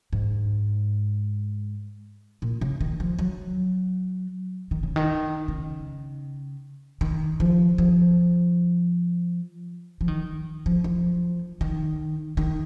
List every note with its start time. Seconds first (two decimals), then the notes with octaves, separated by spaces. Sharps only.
0.13 G#2
2.42 A#2
2.61 C#3
2.81 D#3
3.00 F3
3.19 F#3
4.71 D#3
4.83 C#3
4.96 D#3
5.48 C#3
7.01 D#3
7.40 F3
7.78 F3
10.01 F3
10.08 D#3
10.66 F3
10.84 F3
11.61 D#3
12.37 D#3